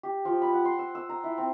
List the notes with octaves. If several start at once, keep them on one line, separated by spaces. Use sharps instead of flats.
G4
F3
B5
F#5
C6
E6
E6
A#5
E4
C4